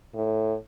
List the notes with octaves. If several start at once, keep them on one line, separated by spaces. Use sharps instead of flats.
A2